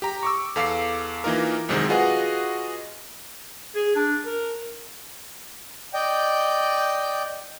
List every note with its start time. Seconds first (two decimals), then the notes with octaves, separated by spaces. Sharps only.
0.02 G4 A#5
0.23 C#6 D6 E6
0.56 E2 A4 F5 D6 E6 C7
1.24 E3 A#3 D#4 F4 A#4
1.69 C2 F#2 C3 D#3 G#3 C4
1.89 F4 F#4 G#4 B4 D#5 F#5
3.75 G#4
3.96 D4
4.25 A#4
5.94 D5 D#5 G5 G6